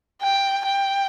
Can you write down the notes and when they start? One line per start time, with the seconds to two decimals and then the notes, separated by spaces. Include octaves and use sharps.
0.22 G5
0.66 G5